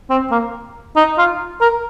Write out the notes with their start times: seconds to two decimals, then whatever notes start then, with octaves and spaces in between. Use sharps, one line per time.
0.10 C4
0.31 A#3
0.96 D#4
1.18 F4
1.61 A#4